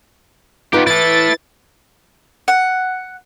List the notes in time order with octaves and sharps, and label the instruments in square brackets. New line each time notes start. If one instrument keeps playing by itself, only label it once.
[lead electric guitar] B3 G4 [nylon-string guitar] D#4 F4 B4
[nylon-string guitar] E3 [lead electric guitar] E4 A4 [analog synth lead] A6
[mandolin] F#5